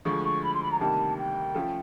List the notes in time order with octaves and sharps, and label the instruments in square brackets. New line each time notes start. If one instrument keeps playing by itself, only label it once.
[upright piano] D2 D3 F3 G#3 [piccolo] C#6
[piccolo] C#6
B5
C6
B5
A#5
[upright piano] D2 C3 D#3 G3 A#3 [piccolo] A5
[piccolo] G5
[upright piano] F3 A3 C#4 F4 A4